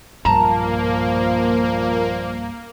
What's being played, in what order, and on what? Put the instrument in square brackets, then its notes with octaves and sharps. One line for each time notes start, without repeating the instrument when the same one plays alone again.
[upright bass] B1 G2 [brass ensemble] A#2 F3 [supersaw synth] A#3 [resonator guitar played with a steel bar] A5 A#5